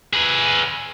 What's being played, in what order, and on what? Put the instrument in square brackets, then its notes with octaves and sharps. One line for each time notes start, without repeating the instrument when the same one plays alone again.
[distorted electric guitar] G#4 B4